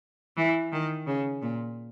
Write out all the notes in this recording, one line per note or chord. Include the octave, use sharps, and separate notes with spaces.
E3
D#3
C#3
A#2